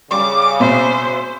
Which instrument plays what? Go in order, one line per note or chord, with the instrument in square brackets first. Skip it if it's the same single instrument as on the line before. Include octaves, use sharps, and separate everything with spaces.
[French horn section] C#3 [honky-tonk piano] G3 [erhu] D6
[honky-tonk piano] B2 E5 [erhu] C5